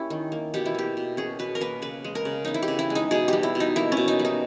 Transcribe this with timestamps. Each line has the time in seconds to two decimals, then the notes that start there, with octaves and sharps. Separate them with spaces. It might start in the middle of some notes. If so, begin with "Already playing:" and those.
Already playing: A#3 C#4 E4 G4
0.10 D#3
0.32 A#3
0.54 B2 G4
0.66 E4
0.75 A#3 G4
0.97 B2
1.17 C#4 G#4
1.39 B2 B4
1.55 A#4
1.61 A#3 B4
1.82 C#3 B4
2.04 G#3
2.15 A#4
2.25 C#3
2.45 B3 D#4
2.54 E4
2.62 G4
2.68 C#3
2.79 E4
2.90 G#3
2.95 D#4
3.11 B2 G#4
3.28 G3 G4
3.43 E4
3.55 B2
3.60 D#4
3.76 A#3 E4
3.92 C#4
3.97 B2
4.08 D#4
4.19 G3
4.25 D#4